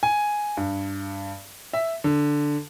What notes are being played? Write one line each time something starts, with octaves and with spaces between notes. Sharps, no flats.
G#5
G2
E5
D3